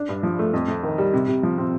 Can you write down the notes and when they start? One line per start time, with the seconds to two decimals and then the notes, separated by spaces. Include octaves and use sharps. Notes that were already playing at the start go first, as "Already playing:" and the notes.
Already playing: D4
0.09 G2
0.23 F3
0.39 A3
0.53 F2
0.68 F2
0.83 D#3
0.98 G3
1.14 C3
1.28 C3
1.43 F3
1.58 C4